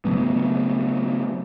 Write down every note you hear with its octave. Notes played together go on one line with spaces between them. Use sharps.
C#3 F#3 A3 B3